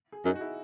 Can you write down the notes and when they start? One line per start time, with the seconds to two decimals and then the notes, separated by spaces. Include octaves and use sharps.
0.12 G#4
0.24 F#2 D#4 F#4
0.36 F#4
0.40 E4 G#4